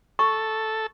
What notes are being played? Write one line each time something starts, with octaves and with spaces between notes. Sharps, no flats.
A4 C#6